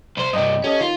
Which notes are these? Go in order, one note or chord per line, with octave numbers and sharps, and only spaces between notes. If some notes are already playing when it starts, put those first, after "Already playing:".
C2 C5
G2 C3 D#5 G5
C#4 G4 A4 D#5
D#3 F4